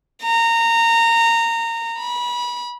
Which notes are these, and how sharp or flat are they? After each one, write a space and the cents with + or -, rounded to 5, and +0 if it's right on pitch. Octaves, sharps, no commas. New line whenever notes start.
A#5 -20
B5 -25